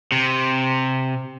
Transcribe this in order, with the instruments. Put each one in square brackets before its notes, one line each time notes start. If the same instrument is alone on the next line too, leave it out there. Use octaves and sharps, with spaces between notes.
[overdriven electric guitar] C3